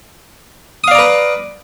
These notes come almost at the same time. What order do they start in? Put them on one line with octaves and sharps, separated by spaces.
D#6 F5 D5 A#5 B4